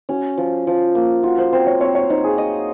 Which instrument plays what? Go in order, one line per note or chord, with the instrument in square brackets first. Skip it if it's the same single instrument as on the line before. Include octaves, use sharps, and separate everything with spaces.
[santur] C#4 [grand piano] F#4
[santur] F3
F3
A#3
[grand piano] F4 [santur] F#4
[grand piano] C5
[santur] C4 [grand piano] C5
[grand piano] C#5
[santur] C4 [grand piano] C#5
[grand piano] C#5
[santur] D#4 [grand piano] C5
[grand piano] G#4
[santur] D#5